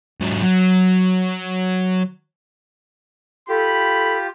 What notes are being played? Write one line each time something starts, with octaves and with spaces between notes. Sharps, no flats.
G#2 F#3
F#3
F4 G4 A4 B5